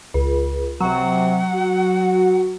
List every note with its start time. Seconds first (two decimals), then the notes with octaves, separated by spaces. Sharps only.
0.14 C#2
0.80 C3 F#3 F#5
1.54 F#4